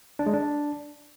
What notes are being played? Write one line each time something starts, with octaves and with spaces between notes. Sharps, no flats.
D4
G#3
D4